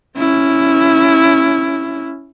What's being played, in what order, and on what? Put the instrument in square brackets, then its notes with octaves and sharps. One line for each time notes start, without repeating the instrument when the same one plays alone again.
[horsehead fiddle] C#4 E4